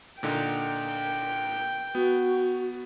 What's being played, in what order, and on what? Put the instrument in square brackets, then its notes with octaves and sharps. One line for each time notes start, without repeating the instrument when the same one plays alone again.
[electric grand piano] A#2 D3 D#4 [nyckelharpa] G5
[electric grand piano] B3 [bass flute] F#4